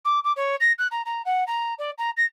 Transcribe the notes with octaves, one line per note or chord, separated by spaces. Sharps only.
D6
D6
C#5
A#6
F#6
A#5
A#5
F#5
A#5
D5
A#5
A#6